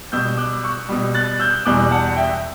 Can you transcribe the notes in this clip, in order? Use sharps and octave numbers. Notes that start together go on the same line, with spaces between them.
B2 G3 E6 G6
D6 F#6
C#6 E6
B2 G3
F#6 A6
E6 G6
E2 B2 G3 D6 F#6
F#5 A5
E5 G5